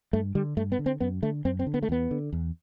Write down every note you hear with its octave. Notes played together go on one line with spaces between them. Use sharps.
G2 A3
D3 G3
G2 A3
B3
D3
C4
F#2 B3
D3 A3
F#2 C4
C4
D3
B3
A3
E2 B3
D3
E2